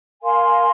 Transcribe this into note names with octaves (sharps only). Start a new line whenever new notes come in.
A#4 F5 G#5 C6